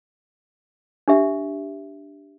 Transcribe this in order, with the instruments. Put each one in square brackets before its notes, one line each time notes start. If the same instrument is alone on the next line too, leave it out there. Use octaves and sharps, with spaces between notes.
[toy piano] D4 G4 E5